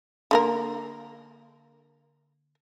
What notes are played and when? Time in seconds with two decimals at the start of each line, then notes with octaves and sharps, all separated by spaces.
0.31 D3 A#3 A#4